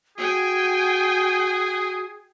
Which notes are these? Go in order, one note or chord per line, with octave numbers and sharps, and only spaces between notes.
F#4 G#4 G5 G#5